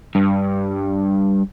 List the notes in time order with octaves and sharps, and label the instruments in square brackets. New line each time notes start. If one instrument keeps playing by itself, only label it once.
[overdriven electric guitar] G2